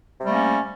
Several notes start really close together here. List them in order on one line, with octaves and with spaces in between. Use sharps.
C3 G3 A3 A#3 C#4